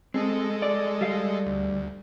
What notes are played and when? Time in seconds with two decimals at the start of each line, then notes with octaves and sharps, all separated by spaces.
0.14 G#3 C4 A4 D#5
0.62 D5
1.01 G3 F5
1.46 D2